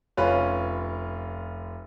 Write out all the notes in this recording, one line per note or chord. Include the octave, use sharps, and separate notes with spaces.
F1 C#4 F4 B4 B5